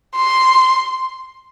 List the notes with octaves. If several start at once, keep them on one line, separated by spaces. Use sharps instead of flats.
C6